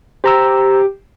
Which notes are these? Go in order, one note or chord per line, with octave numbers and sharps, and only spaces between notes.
G4 C5 A#5 E6